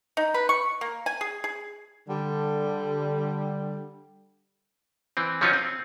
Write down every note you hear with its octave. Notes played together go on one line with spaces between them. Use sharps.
D#4
B4
C#6
A#3
G#5
G#4
G#4
D3 G3
E3 C4
F3 F#3 C#4 D#4 F4
C4